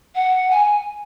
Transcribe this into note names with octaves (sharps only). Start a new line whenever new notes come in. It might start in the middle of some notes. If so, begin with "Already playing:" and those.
F#5
G#5